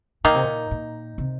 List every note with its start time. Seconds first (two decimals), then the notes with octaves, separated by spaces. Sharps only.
0.24 A#2 D#3 A#3 D#4
0.34 C3
0.44 A#2
0.71 A#2
1.18 C3